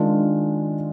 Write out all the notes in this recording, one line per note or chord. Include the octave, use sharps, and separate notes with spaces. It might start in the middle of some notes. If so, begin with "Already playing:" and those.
Already playing: D#3 G#3 D4 F4